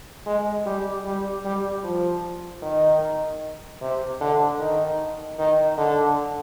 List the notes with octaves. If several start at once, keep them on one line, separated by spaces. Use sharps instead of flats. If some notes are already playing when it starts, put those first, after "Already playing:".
G#3
G3
G3
G3
F3
D#3
C3
D3
D#3
D#3
D3